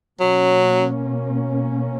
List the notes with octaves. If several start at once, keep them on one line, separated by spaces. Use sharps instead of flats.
B2 F#3 A#3 C#4